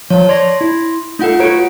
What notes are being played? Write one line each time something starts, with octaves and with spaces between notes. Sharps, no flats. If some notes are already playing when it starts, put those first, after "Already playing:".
F3 C#5 A5
C#5 D5 C6 A#6
E4
A3 D#4 F4 A4 F#5
F#4 B4 C#5 A#5 D7